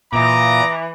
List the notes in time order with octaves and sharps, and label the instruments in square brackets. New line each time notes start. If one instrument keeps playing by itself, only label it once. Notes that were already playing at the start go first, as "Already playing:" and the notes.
[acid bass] A#2 [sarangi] E3 [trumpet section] D#5 A#5 [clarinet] D6